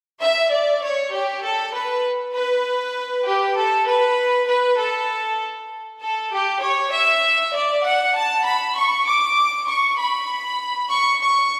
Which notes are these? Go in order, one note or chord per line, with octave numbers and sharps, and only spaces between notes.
E5
D5
C#5
G4
A4
B4
B4
G4
A4
B4
B4
A4
A4
G4
C#5
E5
D5
F#5
A5
B5
C#6
D6
C#6
B5
C#6
C#6